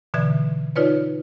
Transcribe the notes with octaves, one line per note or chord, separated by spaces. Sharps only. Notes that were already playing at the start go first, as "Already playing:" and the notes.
B2 D3 E3 E5 G#6
D#4 F4 B4 C#5 D5